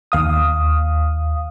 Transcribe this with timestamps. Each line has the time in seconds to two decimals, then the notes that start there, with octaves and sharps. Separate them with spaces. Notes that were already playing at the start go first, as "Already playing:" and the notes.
0.12 D#2 F5 D#6